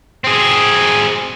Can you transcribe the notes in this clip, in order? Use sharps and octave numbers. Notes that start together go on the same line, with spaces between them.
C4 G#4